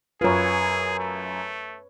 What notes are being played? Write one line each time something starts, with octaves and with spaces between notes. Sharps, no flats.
F#2 F4 G#4 B4 C#5
A3